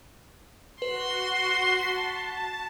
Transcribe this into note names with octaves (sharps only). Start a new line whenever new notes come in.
F#4 B4 C6
A5 B6 C7